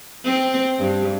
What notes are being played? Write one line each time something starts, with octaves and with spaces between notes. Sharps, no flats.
C4
G2